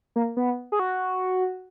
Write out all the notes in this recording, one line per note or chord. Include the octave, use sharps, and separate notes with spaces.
A#3
B3
G#4
F#4